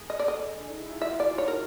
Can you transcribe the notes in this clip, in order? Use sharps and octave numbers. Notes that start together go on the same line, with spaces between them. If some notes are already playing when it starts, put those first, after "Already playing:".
Already playing: G#4
A4 D#5
D5
G#4 D#5
D4
D#4
E4
F4
F#4 E5
D5
C#5
A#4